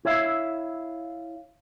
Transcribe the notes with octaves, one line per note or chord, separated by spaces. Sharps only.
E4 C#5 D5 E5 F5